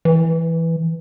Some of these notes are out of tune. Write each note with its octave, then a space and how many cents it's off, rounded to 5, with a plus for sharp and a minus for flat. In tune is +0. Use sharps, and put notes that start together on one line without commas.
E3 +0